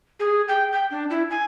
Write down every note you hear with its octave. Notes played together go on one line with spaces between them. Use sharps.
G#4
G5
G5
D4
E4
G#5